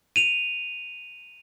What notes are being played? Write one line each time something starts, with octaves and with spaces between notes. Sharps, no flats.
D#7 F7